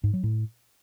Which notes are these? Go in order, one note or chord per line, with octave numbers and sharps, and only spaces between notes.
G#2
F#3
A2